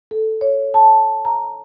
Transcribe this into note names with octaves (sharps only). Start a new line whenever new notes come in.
A4
C#5
A5
A#5